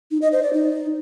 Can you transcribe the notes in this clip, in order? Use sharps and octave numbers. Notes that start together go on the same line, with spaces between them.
D#4
D#5
C5
D5
D#4